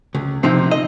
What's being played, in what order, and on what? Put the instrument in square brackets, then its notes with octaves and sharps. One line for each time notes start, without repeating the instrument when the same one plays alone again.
[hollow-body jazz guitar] C#2
C3 F3 C4 D#4
D#5